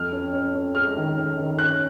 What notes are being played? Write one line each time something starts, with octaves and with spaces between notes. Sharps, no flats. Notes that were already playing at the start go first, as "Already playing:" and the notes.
Already playing: F2 F6
C#4
C#4
C#4
G#3 F6
D#3
C#4
D#3
C#4 F#6